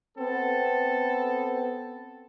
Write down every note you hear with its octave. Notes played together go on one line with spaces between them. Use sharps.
B3 C4 A4